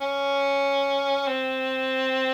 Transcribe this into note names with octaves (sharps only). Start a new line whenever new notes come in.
C#4
C4